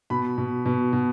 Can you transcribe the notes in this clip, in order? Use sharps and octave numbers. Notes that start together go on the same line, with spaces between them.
B2 B5
B2
B2
B2